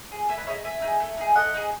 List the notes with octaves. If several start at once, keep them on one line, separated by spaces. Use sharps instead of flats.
G#4
A3 E5 G#5
B4 D#5
D#4 G#4 C#5 E5
A3 E5 G#5
D#4 G#4
A3
D#4 G#4
A3 D#5 F#5
D#4 G#4